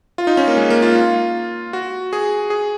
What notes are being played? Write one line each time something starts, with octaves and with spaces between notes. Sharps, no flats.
F4
D#4
C#4
A#3
G#3
A#3
F4
F#4
G#4
G#4